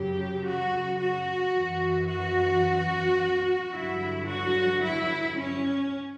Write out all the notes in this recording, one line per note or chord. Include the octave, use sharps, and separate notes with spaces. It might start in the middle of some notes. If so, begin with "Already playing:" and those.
Already playing: F#2 C#3 F#3 G4
F#4
F#4
F#2 E3
F#4
G2 D3 F#3 E4
F#4
E4
C#4